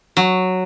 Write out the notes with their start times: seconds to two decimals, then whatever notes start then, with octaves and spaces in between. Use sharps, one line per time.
0.17 F#3